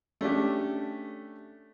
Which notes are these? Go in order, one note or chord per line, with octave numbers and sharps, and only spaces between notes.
A3 C#4 D4 G4